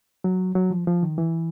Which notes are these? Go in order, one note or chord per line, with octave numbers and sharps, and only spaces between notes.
F#3
F#3
F3
F3
D#3
E3